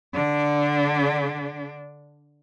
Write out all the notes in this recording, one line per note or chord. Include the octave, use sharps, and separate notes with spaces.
D3 D4